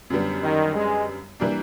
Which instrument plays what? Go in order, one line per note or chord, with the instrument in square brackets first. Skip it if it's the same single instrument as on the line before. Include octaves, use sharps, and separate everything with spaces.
[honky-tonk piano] F#2 D3 G3 B3
[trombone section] D#3
G#3
[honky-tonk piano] E3 G3 A#3 D4